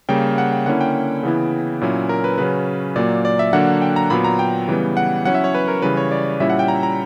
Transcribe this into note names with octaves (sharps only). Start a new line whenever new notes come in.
C#3 G3 A#3 G5
F#5
G5
D3 A#3 C#4 E4 F#5
G5
C#3 E3 B3 E4
A#2 F#3 C#4 E4
A#4
B4
C#3 F#3 C#4 B4
A#2 F#3 A#3 D5
D5
E5
D3 F#3 A#3 D4 F#5
G5
A#5
A#2 F#3 B3 B5
A#5
G5
C#3 E3 G3 B3
F#5
F#3 C#4 E4 F#5
E5
C#5
B4
A#4
C#3 E3 G3 B4
C#5
D5
A#2 G3 C#4 E4 E5
F#5
G5
A#5
A#5